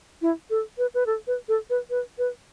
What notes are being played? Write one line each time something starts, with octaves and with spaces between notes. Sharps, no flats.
E4
A4
B4
B4
A4
B4
A4
B4
B4
B4